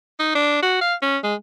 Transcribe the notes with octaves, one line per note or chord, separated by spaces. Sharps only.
D#4
D4
F#4
F5
C#4
G#3